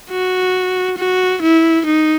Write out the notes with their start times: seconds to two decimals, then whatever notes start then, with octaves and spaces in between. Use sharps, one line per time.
0.11 F#4
0.98 F#4
1.42 E4
1.86 D#4